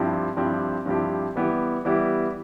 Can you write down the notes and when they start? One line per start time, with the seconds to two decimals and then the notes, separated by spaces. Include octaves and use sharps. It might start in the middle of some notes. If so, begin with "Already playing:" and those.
Already playing: G2 F3 C4 E4 G4
0.37 G2 F3 C4 E4 G4
0.86 G2 F3 C4 E4 G4
1.36 E3 G3 B3 E4 G4
1.85 E3 G3 B3 E4 G4